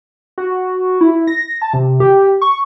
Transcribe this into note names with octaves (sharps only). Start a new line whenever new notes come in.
F#4
E4
A#6
A5
C3
G4
C#6